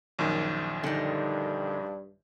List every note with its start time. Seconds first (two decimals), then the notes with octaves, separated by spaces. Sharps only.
0.19 A#1 F#2 D#3
0.83 G2 D3 D#4